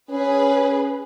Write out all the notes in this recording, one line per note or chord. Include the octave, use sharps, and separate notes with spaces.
C#4 G#4 B4